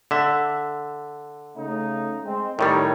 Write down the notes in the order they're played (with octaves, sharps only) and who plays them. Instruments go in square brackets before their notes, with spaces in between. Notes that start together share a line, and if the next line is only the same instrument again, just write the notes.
[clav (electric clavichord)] D3 E5
[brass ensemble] C#3 A3 D#4
G#3 C4
[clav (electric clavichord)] A2 D#3 G3 [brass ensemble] A#4 C#5